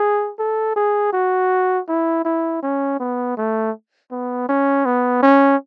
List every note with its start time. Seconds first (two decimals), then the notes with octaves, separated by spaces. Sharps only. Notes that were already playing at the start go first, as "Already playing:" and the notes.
Already playing: G#4
0.39 A4
0.76 G#4
1.13 F#4
1.88 E4
2.25 E4
2.63 C#4
3.00 B3
3.37 A3
4.12 B3
4.49 C#4
4.86 B3
5.23 C#4